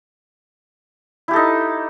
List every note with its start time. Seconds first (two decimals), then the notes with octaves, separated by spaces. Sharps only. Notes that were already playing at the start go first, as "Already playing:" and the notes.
1.28 E4
1.31 G4
1.33 A4
1.36 D#4